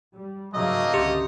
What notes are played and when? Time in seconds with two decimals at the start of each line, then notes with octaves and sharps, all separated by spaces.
0.13 G3
0.54 G#2 C#3 F#3 A3 A#3 D#5
0.94 C#2 D3 C#4 G4